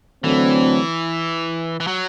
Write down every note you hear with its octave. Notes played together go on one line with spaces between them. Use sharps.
D3 E3 F#3 A3 C4
E3
F#3